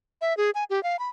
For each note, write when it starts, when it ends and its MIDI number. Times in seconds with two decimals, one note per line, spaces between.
0.21 0.36 76
0.37 0.50 68
0.55 0.64 80
0.70 0.82 67
0.83 0.99 77
0.99 1.09 83